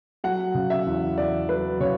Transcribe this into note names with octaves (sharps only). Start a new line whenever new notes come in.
F#3 F#5
C#3
E5
E2
E2 D5
F#3 B4
C#3 C#5